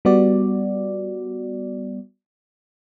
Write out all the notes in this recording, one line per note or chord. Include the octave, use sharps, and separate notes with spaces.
G3 B3 F#4 D5